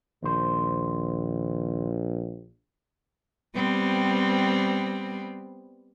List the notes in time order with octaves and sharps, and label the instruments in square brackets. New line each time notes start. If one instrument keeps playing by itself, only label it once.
[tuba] A#1 [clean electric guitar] D#2 C5
[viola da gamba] G3 B3 C4